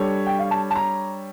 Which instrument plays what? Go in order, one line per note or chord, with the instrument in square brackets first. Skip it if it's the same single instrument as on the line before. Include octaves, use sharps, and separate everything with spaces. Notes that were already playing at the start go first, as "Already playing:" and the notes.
Already playing: [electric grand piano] G3 D4 A4 C#5
[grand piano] G5
F5
A5
A5
A#5